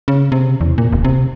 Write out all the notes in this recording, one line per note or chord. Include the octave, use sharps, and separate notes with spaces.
C#3
C3
E2
A#2
D1
C3